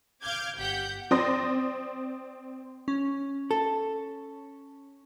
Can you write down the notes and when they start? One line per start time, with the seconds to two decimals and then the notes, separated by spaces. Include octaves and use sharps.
0.22 F5 D6 F6 G6 G#6
0.58 G1 G4 F#5 G6 B6
1.11 C4 D5 C6 D#6 A#6
2.88 C#4
3.51 A4